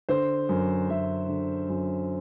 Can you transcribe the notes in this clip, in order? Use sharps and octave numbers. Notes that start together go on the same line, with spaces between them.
D3 C5
F#2
F#2 E5
D3
F#2